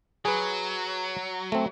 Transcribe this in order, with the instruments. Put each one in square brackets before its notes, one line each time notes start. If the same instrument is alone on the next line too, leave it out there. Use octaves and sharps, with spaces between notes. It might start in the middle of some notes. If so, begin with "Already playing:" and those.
[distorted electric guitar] F#3 [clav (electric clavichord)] G#4 B4
[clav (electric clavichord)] A3 C4